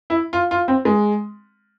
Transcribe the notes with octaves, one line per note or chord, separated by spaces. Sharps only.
E4
F4
F4
C4
G#3